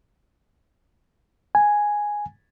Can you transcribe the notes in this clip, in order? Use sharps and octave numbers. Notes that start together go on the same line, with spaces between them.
G#5